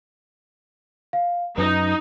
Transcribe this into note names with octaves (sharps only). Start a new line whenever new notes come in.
F5
F#2 D#4 B4